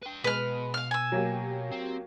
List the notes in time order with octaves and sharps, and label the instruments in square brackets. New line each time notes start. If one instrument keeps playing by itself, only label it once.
[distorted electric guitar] B4 G5
[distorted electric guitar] B2 [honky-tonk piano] G#3 [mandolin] B4 F6
[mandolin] F5 F6
G#5 E6
[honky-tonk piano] F#3 A#3 G4
[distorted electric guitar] C4